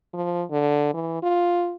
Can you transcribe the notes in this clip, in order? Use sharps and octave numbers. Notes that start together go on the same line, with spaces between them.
F3
D3
E3
F4